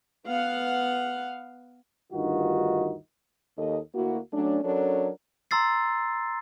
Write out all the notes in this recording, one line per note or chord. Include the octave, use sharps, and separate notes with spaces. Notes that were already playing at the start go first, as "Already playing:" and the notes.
B3 F5 F#5
D2 G2 D#3 D#4 F4 F#4
D#2 A4 D#5
D2 A#3 E4 F#4
F#3 A3 C#4 D4
F#3 C#4 D4 A4 A#4 C#5
A#5 C6 E6 A6 C7